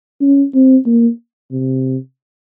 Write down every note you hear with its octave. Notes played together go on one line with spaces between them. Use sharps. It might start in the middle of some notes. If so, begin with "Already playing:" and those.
C#4
C4
A#3
C3